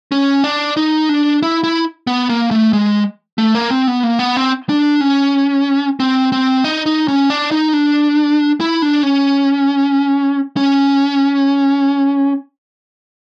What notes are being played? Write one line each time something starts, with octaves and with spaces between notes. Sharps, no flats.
C#4
D4
D#4
D4
E4
E4
B3
A#3
A3
G#3
A3
A#3
C4
B3
A#3
B3
C4
D4
C#4
C4
C4
D#4
D#4
C#4
D4
D#4
D4
E4
D4
C#4
C#4